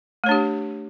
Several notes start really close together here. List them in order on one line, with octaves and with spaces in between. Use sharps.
A3 C#5 D4 G4